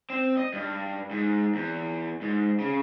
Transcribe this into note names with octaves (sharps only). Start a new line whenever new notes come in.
C4
D#5
G2
G#2
E2
G#2
C#3